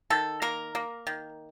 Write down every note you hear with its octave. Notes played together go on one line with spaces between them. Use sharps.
D#3 A4
A#3 A#4
A#3
D#3